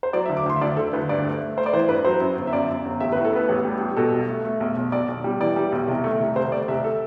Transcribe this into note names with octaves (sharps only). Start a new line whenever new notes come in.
C5
F#3 D5
E5
D2
D6
D2 C6
E5
D2 D5
D2 A4
D2 B4
G2 D5
A3
A3
A3 C5
D5
E3 C5
G2 B4
F#3 C5
F#2
G1
E5
F#2 D5
F#2
G1
A1 E5
B4
A2
A4
B3 B4
A1
G3
G3
B2 A4
B1
A3
A3
B1
B1
B1 D5
B1
G3
E3 D5
G3
B1
C2
A3
C2
C2 C5
A3 D5
C2 E5
A4